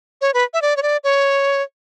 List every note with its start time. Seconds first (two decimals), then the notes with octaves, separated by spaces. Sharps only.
0.21 C#5
0.34 B4
0.54 E5
0.62 D5
0.77 C#5
0.83 D5
1.04 C#5